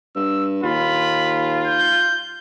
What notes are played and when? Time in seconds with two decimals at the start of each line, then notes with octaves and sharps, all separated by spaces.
0.16 G2 E6
0.63 D#2 F4 B5
1.66 G6